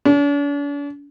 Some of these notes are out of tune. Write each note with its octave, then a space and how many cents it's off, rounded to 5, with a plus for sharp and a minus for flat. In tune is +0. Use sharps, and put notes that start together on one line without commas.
D4 -45